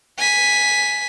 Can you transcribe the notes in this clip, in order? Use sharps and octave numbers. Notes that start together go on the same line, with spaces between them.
G#5 B6